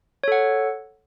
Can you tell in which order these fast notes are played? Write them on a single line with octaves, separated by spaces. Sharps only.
C#5 A4 F#5